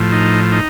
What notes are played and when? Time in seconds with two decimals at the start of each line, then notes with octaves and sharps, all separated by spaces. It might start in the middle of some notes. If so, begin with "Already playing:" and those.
Already playing: A2 F3
0.12 D#4
0.52 D#4